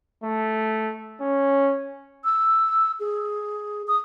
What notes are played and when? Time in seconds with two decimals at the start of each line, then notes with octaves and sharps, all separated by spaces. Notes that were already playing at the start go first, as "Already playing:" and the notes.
0.24 A3
1.21 C#4
2.24 E6
3.00 G#4
3.88 D#6